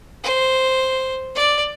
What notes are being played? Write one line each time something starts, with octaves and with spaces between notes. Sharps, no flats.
C5
D5